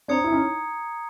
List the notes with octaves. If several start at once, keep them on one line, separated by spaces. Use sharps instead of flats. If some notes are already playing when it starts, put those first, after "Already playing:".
C4 D4 A#5 D#6 G#6 C#7
E4
C#4 D#4